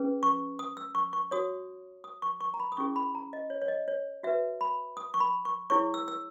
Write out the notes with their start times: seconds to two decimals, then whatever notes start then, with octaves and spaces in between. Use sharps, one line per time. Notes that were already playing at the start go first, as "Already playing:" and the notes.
Already playing: C#4 G#4 B4
0.23 C#6
0.59 D#6
0.77 E6
0.95 C#6
1.13 C#6
1.31 F#4 C#5 D#6
2.04 D#6
2.22 C#6
2.41 C#6
2.54 A#5
2.60 B5
2.72 D#6
2.77 C#4 E4 G#4 C#6
2.96 B5
3.15 A#5
3.33 D#5
3.50 C#5
3.62 C#5
3.68 D#5
3.88 C#5
4.23 F#4 B4 E5
4.61 B5
4.97 D#6
5.14 C#6
5.20 B5
5.45 C#6
5.70 E4 G#4 C#5 C#6
5.94 E6
6.08 E6